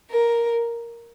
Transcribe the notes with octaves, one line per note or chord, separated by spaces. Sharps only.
A#4